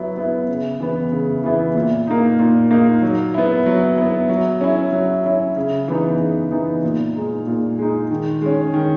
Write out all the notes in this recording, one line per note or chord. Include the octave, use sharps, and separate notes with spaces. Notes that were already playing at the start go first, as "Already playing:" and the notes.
Already playing: F#3 B3 E4
B3 E4
C#3
E3 B3 E4
C#3
E3 B3 E4
A#2
A#3 D#4
A#2
A#3 D#4
F#3
B3 E4
F#3
B3 E4
F#3
C#4 E4
F#3
C#4 E4
C#3
E3 B3 D#4
C#3
E3 B3 D#4
A#2
G#3 D#4
A#2
G#3 D#4
D#3
G#3 C#4
D#3